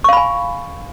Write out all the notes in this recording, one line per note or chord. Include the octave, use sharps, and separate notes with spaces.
F5 G#5 B5 C#6